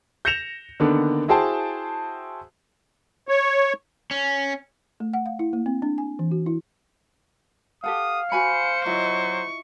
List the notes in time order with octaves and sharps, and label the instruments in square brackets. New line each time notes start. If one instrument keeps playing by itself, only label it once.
[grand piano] G6 A#6 C#7 E7 F7
D3 D#3 A#3 B3 D4
E4 F#4 G#4 C5 G5 A5
[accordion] C#5
[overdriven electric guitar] C#4
[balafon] A3
F#5
F5
E4
A#3
C4
D4
G#5
E3
F#4
E4
[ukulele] G4 A4 F#5 [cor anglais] F5 [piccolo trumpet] D#6
[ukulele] F#4 G#5 B5 [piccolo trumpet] C5 [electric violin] C#7
[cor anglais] F#3 [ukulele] E4 F4 D#5 [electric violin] C#6